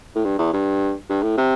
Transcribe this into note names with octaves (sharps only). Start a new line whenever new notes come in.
A2
G2
E2
G2
G2
A2
C3